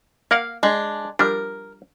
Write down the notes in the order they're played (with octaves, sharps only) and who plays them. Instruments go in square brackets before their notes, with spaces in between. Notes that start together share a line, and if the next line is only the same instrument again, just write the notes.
[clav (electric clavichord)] A#3 A#4 F#5 [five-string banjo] F5
[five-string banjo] G#3 D4
[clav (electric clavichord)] F3 G3 D4 [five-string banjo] A#4